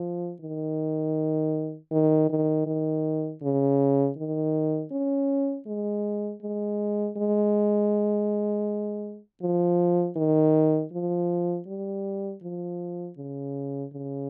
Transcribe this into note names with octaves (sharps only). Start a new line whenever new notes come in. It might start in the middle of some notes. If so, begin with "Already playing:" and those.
Already playing: F3
D#3
D#3
D#3
D#3
C#3
D#3
C#4
G#3
G#3
G#3
F3
D#3
F3
G3
F3
C#3
C#3